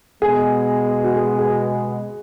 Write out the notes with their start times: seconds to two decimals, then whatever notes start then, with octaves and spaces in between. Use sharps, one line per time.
0.22 B2 G#3 B3 G#4
1.04 F#4
1.16 G#4
1.39 G#4